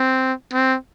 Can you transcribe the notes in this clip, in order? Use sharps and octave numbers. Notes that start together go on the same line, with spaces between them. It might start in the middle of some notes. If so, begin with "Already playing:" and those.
Already playing: C4
C4